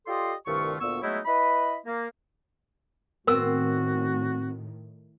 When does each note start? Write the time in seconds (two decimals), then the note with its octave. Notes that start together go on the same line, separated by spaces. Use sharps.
0.07 F4 G4 A4 D5 D#5 C6
0.46 C2 G2 D#3 A3 F4 C#6
0.80 D2 A#2 B3 C#6 E6
1.02 F#3 G#3 A3 B3 D#4 E4
1.25 E4 B4 D#5 B5
1.86 A#3
3.27 A2 D#3 B3 C4 F#4 A#4 E6